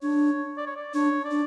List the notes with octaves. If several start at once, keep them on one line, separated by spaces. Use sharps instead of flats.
D4 C#5
D5
C#5
D5
D4 C#5
D5
D4